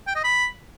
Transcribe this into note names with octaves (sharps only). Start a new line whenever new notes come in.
G5
D#5
B5